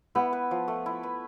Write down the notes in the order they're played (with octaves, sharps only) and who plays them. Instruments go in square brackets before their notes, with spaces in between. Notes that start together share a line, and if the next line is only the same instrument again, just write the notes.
[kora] B3 [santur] E4
[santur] B4
F3
A3
E4
B4